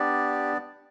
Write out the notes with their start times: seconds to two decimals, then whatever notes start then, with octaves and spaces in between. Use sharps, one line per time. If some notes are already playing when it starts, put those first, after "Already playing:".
Already playing: B3 D4 G4 D5